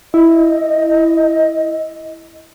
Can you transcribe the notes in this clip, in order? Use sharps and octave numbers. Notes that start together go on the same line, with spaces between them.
E4 D#5